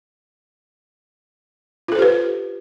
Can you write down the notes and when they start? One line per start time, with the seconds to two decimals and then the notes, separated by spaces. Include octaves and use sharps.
1.88 F4
1.92 A4
1.95 C5
1.99 G4
2.02 B4